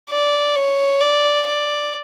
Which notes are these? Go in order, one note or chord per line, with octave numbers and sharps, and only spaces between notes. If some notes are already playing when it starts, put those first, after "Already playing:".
D5
C#5
D5
D5